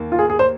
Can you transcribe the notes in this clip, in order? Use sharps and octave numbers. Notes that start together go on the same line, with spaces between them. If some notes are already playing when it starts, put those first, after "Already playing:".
Already playing: D#2 D#3 A#3
F4
G#4
G#4
C5